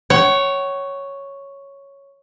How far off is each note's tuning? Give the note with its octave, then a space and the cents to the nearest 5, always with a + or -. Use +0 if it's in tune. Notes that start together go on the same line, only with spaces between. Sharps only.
C#5 +0 F#5 +40